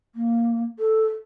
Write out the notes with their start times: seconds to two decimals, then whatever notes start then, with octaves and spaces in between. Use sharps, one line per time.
0.15 A#3
0.79 A4